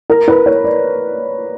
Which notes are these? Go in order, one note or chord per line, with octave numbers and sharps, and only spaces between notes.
A#4
B4
C#5
D5